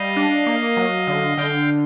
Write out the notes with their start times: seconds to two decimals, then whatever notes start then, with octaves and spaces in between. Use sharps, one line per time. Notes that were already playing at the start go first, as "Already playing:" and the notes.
Already playing: G3 D#5 F5
0.16 D4
0.47 A#3
0.77 F#3
1.07 D3
1.38 D3 F5 G5